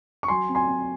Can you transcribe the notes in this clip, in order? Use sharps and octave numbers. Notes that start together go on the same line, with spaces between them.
C#6
F#3 G#5 C6
C4
G#5 C6
C4